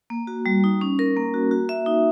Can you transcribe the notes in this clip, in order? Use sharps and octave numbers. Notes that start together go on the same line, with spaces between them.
A#3
F#4
G3
D#4
C#4
A#4
A#3
F#4
F#4
E5
D#4